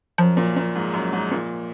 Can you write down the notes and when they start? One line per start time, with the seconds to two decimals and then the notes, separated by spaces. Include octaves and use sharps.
0.18 F#2 F3
0.37 A#2
0.56 A#2
0.76 G#2
0.94 F#2
1.13 G#2
1.31 A#2